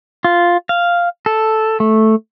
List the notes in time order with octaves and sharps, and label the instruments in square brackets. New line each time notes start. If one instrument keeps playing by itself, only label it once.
[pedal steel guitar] F4
F5
A4
A3